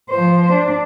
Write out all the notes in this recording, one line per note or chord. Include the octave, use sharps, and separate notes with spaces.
F3 C5
D4